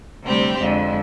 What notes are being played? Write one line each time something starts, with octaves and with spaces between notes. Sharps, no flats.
D2 C3 G3 C4 G4
F2 D3 G#3